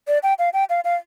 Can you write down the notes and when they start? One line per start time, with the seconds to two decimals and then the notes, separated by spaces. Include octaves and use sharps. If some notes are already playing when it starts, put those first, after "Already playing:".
0.08 D5
0.23 G5
0.39 F5
0.54 G5
0.70 F5
0.84 F5